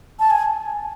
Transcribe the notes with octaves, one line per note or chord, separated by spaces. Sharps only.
A5
G#5